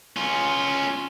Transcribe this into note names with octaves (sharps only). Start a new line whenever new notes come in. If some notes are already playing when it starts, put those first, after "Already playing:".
C#4 F4